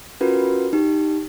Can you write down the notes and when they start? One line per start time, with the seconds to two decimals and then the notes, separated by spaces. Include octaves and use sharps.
0.20 C#4 F4 F#4 A#4 B4
0.73 D#4 G4